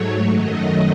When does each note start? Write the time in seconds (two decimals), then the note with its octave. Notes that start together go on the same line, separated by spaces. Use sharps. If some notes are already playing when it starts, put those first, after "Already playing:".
Already playing: G#2 F#3 A3 C#5
0.26 F#2 D#3 F#3 A3 D#5